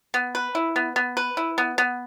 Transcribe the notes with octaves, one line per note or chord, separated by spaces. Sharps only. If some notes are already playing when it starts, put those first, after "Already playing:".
B3
B4
E4
B3
B3
B4
E4
B3
B3